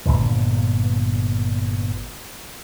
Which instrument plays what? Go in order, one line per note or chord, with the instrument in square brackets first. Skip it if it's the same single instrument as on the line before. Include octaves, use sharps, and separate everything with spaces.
[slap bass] G1 C2 A#2 D3